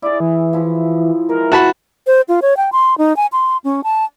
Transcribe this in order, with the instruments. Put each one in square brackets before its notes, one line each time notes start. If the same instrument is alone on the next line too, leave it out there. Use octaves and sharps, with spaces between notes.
[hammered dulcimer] E4 G#4 [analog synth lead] D5
[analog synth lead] E3
[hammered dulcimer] F3 E4
[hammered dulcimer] E3 G#3 [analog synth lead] A#4
[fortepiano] F#4 A5 B5
[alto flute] C5
F4
C#5
G5
C6
D#4
G#5
C6
C#4
A5